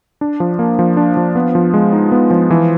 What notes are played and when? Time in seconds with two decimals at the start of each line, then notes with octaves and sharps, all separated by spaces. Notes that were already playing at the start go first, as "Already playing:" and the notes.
0.21 D4
0.40 F3
0.59 A#3
0.79 F3
0.97 D4
1.17 F3
1.35 B3
1.55 F3
1.74 G#3
1.93 D#4
2.12 B3
2.31 F3
2.51 E3